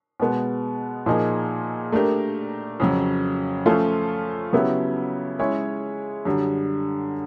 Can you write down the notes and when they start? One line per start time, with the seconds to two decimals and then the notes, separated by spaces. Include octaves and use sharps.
0.20 B2 G#3 B3
1.06 A#2 F3 A#3 D#4 G#4
1.92 A3 D4 G4 A#4
2.80 F2 C#3 F#3
3.66 F3 A3 C#4 F4 A4
4.53 C#3 F#3 B3 E4 G4
5.39 G#3 C#4 E4 G#4 C#5
6.25 F#2 D3 G3